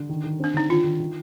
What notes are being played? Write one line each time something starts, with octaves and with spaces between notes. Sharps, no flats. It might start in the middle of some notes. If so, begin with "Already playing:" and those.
Already playing: D3
D#3
D#3
C4 D4
D3 D#4
D#3 F4
D#3
D#3